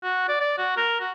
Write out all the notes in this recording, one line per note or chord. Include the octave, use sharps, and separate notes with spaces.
F#4
D5
D5
F#4
A#4
F#4